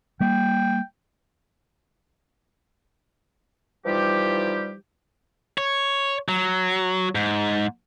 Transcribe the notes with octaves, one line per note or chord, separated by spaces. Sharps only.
G3 A#3 G5
E3 F3 G3 D#4 F4 G4
C#5
F#3
G#2